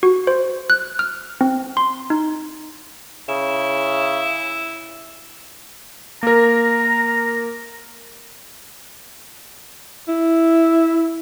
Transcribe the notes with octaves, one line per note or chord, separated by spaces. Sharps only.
F#4
C5
F#6
F6
C4
C6
D#4
C#3 E4
A#3 A#4 A#5
E4